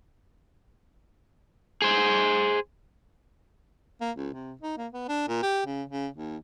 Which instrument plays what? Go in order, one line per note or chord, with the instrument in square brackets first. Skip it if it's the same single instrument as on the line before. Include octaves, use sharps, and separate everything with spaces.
[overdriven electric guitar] G#4 C5
[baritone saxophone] A#3
C#2
C3
D#4
A#3
B3
D4
A#2
G4
C#3
C#3
D#2